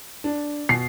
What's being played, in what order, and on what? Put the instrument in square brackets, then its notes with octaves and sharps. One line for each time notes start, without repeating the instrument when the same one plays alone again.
[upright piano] D4
[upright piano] B2 [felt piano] C7